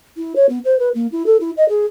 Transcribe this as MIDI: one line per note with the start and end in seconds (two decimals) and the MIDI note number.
0.17 0.33 64
0.35 0.46 73
0.49 0.58 59
0.65 0.78 72
0.79 0.89 71
0.94 1.07 58
1.12 1.25 64
1.26 1.36 69
1.40 1.50 64
1.57 1.67 75
1.69 1.85 68